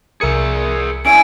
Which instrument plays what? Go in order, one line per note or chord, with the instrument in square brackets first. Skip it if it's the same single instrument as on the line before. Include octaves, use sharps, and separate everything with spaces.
[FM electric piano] C2 A#4 C#7 [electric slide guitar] G#4 E5
[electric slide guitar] C#4 D4 E4 [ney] G#5 [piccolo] D7